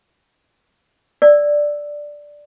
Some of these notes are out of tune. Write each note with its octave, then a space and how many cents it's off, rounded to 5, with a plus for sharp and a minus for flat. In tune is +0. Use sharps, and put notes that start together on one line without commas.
D5 +0 E6 +0